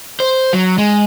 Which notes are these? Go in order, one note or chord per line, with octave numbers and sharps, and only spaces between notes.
C5
F#3
G#3